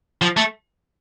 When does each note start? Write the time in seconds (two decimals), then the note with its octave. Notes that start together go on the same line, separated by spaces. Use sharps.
0.22 F3
0.37 A3